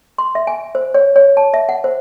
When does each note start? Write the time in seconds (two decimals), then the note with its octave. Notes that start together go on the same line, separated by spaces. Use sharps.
0.18 C6
0.35 E5
0.47 G#5
0.75 C5
0.94 C#5
1.16 C#5
1.37 A5
1.54 E5
1.69 F#5
1.84 C5